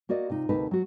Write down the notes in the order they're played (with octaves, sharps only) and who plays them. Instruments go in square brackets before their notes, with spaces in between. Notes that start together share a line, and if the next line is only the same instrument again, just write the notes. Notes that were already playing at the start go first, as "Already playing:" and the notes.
[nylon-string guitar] A#3 F#4 A#4 D5 D#5
C3 D#4 F4
D2 C3 A#3 D#4 B4 A5
F#3 F#4